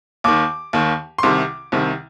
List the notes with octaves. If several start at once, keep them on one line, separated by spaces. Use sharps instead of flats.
D#2 D#3 D6
D#2 D#3
C6
C2 C3 D#3 D6
C2 C3 D#3